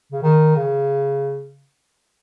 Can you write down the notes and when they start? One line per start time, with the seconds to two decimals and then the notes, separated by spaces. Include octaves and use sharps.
0.12 C#3
0.23 D#3
0.56 C#3